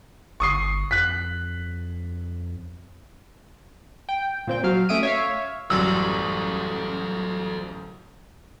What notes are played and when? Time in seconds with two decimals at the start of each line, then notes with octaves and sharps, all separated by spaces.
0.40 G1 C#6 D#6 C7
0.91 F2 F#6 B6
4.09 G5
4.47 A#2 C4 G5
4.64 F#3 F5
4.89 A3 C#4 E5 D#6 D7 D#7
5.03 C#5 E5 F5
5.70 A1 F#2 F#3 G3 F#4 A4 C5 E6